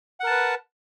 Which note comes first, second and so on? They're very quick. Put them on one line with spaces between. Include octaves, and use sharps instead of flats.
F#5 A#4 A5 B4